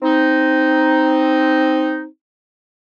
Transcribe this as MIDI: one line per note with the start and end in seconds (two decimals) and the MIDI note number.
0.03 2.05 60
0.03 2.05 63